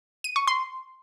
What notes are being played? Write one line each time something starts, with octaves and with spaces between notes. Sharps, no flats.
D#7
C#6
C6